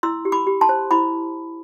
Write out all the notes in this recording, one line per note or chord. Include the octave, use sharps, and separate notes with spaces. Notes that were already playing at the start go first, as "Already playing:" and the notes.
E4 C6 E6
G4
B5 D6
G4
A5 C6
C5
E4 B5 D6